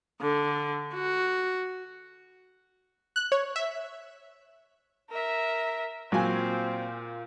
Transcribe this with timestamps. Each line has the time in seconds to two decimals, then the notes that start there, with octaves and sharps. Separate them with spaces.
0.21 D3
0.94 F#4
3.16 F#6
3.32 C#5
3.56 E5
5.10 A#4 E5
6.12 A#2 F#3 C4 F5 G#5